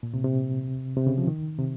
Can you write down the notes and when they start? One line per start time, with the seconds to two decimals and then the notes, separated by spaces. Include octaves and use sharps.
0.03 A#2
0.14 C3
0.24 C3
0.97 C3
1.07 C#3
1.18 F3
1.27 D#3
1.59 C3